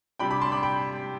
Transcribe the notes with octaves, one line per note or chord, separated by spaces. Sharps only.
C3 G3 D4 G5 B5
B5 D6
A5 C6
B5 D6
G5 B5